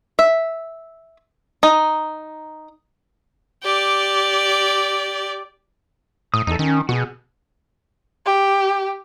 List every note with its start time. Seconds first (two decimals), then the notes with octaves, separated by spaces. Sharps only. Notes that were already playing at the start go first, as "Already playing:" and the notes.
0.19 E5
1.63 D#4
3.63 G4 D5
6.34 A2 D#6
6.47 E2 D#4 A4
6.59 D#3 C#4
6.89 B2 F#4 G#4
8.26 G4